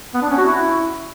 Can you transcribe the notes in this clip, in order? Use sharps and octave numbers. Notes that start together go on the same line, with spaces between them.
B3
D4
C#4
F#4
E4